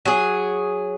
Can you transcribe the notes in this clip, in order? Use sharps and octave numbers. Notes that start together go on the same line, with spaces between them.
F#3 G#4